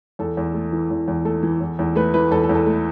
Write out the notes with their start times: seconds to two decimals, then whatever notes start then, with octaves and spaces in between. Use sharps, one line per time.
0.19 E2 A4
0.37 E2
0.54 A3
0.72 E3
0.90 E2
1.08 E2
1.25 A3 A4
1.43 E3
1.61 E2
1.79 E2
1.95 A3 B4
2.14 E3 B4
2.31 E2 A4
2.44 A4
2.49 E2
2.55 A4
2.66 A3